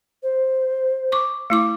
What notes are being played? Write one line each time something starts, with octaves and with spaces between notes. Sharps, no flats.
C5
C#6 D6
A3 E4 D6